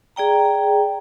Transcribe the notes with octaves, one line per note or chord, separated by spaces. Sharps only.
G#4 D5 G5 A#5